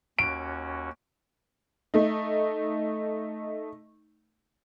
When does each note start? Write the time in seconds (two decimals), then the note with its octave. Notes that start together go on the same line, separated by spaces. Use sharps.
0.19 D#2 C#4 F#4 D7
1.94 A3 D#4